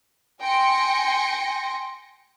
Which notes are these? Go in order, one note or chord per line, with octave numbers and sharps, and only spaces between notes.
G5 G#5 C6 A#6 C#7